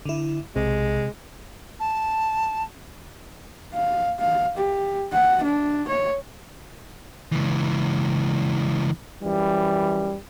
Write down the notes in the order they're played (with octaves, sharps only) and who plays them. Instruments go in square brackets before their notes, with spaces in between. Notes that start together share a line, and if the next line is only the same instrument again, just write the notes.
[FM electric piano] D3 E4
[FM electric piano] B1 [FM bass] C3 [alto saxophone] G#3
[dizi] A5
[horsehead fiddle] F5
F5
G4
F#5
D4
C#5
[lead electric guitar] C#2 E3
[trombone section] F#2 E3 G3